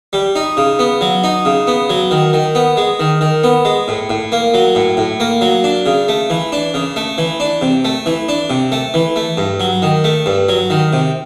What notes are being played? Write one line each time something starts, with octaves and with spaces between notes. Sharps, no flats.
G3
D#4
C#3
B3
F#3
D#4
C#3
B3
F#3
D#3
D#3
B3
G#3
D#3
D#3
B3
G#3
A2
A2
A#3
F#3
A2
A2
A#3
F#3
D4
C#3
A3
E3
D4
C#3
A3
E3
D4
C3
A3
E3
D4
C3
A3
E3
A3
G2
F#3
D#3
A3
G2
F#3
D#3
C3